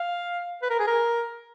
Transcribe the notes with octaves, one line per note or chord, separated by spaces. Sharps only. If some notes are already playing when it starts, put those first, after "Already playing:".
Already playing: F5
B4
A#4
G#4
A#4